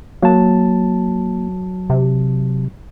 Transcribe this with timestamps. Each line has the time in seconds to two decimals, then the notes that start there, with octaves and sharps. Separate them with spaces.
0.23 F#3 A#3 A5
1.90 C3